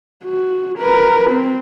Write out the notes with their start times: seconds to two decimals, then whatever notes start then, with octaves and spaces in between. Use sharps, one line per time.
0.24 F#4
0.78 A#4 B4
1.30 C4